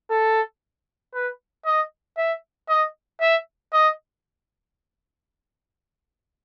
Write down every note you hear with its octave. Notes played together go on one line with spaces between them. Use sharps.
A4
B4
D#5
E5
D#5
E5
D#5